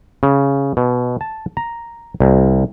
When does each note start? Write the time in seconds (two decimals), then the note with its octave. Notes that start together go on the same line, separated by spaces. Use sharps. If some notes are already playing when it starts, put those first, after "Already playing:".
0.23 C#3
0.77 B2
1.21 A5
1.57 A#5
2.20 C2